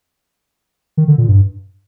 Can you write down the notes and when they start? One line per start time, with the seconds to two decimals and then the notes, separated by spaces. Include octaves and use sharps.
0.97 D#3
1.08 D3
1.18 A#2
1.28 G2